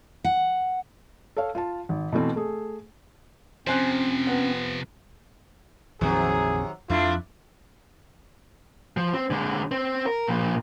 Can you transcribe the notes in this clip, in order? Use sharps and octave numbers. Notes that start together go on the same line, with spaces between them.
F#5
A4 C#5 F5
F4 A5
G#1
B2 E3 A3 C4
A3 G#4
C3 F3 C4 C#4 C5 G#5 F#6
B3
A#1 F2 C3 D#3 F#3 C4 G#4
F2 F3 A3 D4 E4 F4
F3
C4
D3 G#3
C4
A#4
A#2 F3